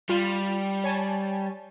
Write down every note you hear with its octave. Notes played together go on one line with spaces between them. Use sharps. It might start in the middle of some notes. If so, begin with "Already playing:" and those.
G3 F4
C#5 G#5 A5